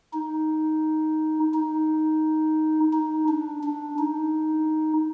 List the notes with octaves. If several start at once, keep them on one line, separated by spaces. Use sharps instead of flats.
D#4
D#4
D#4
D4
D4
D#4